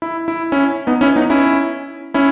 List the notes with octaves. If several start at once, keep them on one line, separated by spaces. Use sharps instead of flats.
E4
E4
C#4 E4
B3 D#4
C#4 E4
B3 D#4
C#4 E4
C#4 E4